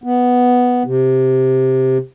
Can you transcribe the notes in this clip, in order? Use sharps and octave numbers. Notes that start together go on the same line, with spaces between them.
B3
C3